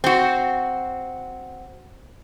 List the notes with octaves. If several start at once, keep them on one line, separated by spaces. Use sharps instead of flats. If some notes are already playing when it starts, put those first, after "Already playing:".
C4 F#4